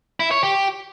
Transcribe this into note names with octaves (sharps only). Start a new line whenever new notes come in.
E4
C#5
G4